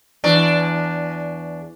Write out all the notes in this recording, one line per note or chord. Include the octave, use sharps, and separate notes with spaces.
E2 D4